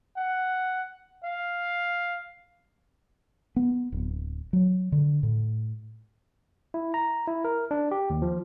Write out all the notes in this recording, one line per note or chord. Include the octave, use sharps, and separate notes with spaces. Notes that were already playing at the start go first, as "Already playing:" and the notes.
F#5
F5
B3
D1
F#3
D3
A2
E4
A#5
E4
A#4
D4
G4
D#2
F3